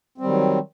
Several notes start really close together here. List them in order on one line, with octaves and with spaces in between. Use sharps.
C4 G3 D#3 F#3